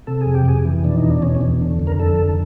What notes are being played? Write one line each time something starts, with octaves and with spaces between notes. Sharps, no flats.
C3 A4
F2 G#4
G4
F2 G#4
E3
B2 D4
D#4
E2
D4
B2 C#4
C#4
E2
D3
F2
A#4
D3 A4
F2